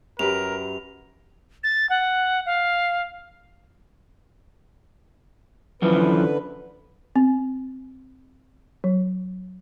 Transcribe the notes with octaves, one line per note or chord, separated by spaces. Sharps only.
F#2 G4 A#4 B4 F7
A6
F#5
F5
F#2 D3 E3 F3 B4
C4
F#3